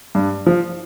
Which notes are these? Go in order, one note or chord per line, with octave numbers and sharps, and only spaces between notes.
G2
F3